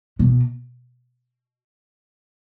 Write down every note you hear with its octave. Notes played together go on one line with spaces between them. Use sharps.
B2